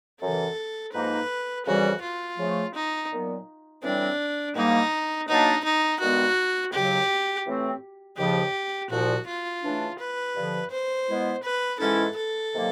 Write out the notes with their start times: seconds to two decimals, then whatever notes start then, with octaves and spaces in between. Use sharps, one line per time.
0.21 F#2 C#3 E3 A4
0.93 G#2 F3 A#3 D#4 B4
1.66 F2 C#3 E3 G3 F#4
2.01 F4
2.38 C#3 F3 A3
2.74 D#4
3.10 A#2 F#3 B3
3.83 A2 E3 G3 C4 D4
4.55 G#2 D#3 G3 A#3 D#4
5.28 B2 F#3 A#3 D4 D#4
5.64 D#4
6.00 G2 D#3 G#3 B3 F#4
6.73 D#2 C#3 F#3 G4
7.45 A2 E3 A3 C4
8.17 D#2 C#3 F3 G4
8.90 C2 A#2 F3 F#4
9.27 F4
9.63 C#3 E3 A3 D4
9.99 B4
10.35 G2 D3 F3
10.71 C5
11.07 B2 G#3 B3 E4
11.43 B4
11.79 G#2 E3 G#3 C#4 E4 A4
12.16 A4
12.52 C3 D#3 F#3 A#3